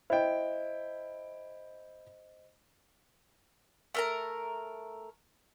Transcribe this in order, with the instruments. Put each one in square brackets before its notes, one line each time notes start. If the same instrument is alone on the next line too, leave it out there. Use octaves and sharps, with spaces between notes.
[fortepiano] E4 G5 [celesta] C5 D#5
[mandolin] A3 A#4 A#5